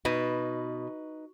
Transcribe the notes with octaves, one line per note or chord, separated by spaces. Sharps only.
B2 D#4 B4